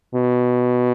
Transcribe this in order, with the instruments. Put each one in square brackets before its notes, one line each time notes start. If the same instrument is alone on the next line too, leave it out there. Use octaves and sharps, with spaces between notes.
[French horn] B2